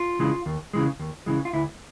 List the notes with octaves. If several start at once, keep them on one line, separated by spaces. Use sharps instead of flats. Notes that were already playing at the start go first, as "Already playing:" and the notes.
Already playing: F4
C#3 E3 G#3
D#2
C#3 E3 G#3
D#2
C#3 E3 G#3
F4
D2 E4